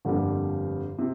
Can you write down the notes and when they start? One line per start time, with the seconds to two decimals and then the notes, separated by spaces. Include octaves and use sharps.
0.05 G1 F2 D3 G3 A#3
0.99 C3